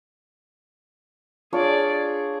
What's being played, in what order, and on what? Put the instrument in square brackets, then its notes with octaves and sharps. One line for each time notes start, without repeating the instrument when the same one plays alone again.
[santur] D4 F4 C#5 [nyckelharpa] G#4 D5
[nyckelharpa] G#4